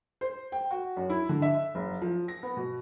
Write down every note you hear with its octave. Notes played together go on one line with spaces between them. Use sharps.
C5
G5
F#4
F#2
E4
D3
E5
F#1
F3
A#6
B3
B2